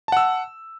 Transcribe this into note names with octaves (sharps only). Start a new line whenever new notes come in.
F#5 A5 E6